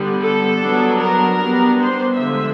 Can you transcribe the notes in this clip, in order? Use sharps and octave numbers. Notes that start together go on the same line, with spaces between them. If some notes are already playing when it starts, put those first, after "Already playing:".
Already playing: D3 G3 B3
A4
F#3 B3 D4
A#4
G3 B3 D4
C5
D3 F3 G#3 E5